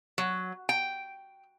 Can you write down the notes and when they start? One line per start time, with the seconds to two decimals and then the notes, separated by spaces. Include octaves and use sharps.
0.18 F#3
0.69 G5